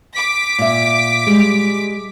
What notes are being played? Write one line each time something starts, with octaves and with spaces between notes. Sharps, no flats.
D6 B6
A#2 E5
G3 G#3